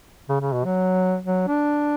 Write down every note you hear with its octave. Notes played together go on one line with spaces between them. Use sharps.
C#3
C#3
B2
F#3
F#3
D4